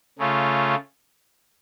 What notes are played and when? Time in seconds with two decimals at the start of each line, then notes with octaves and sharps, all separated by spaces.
0.18 C#3 A3 C#4 F4